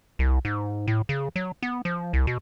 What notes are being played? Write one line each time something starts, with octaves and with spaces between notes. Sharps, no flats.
C2
G#2
A2
C#3
F#3
B3
F3
C2
B2